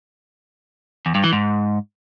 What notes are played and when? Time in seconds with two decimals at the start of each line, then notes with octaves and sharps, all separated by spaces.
1.06 E2
1.15 G2
1.24 E3
1.33 G#2